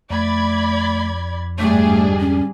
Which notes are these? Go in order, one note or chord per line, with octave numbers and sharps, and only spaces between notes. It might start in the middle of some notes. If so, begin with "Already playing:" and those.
F2 A3 D5 B5 G#6
G1 G#2 G3 A3 D4 G#4
C#4